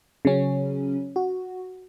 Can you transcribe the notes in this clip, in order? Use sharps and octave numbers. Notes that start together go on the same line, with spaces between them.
C#3 F#3 C#4
F#4